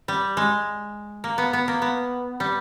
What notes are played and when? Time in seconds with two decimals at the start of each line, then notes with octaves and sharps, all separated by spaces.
0.08 G3
0.37 G#3
1.24 A#3
1.38 B3
1.53 B3
1.68 A#3
1.82 B3
2.40 G3